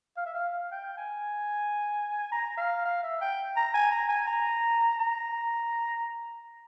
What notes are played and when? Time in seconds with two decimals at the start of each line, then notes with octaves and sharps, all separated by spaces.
0.17 F5
0.26 E5
0.34 F5
0.72 G5
0.98 G#5
2.32 A#5
2.58 F5
2.85 F5
3.03 E5
3.21 G5
3.56 A#5
3.74 G#5
3.91 A#5
4.09 G#5
4.27 A#5
4.99 A#5